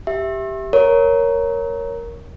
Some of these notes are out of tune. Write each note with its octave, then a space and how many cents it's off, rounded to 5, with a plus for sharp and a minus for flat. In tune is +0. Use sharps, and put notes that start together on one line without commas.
G4 +0 E5 +0
A#4 +5 C#5 +0